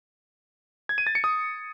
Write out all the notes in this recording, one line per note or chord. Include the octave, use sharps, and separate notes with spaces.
G#6
D#7
A6
C#7
D#6